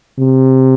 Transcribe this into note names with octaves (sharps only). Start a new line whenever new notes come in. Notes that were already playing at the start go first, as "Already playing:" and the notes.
C3